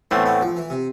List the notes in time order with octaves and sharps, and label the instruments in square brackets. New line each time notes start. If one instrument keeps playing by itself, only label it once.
[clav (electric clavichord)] A2 E3 A3 C4 [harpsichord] B3
[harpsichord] B3
F3
E3
C3